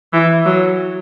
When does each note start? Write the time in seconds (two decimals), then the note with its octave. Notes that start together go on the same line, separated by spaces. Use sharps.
0.13 E3
0.46 F#3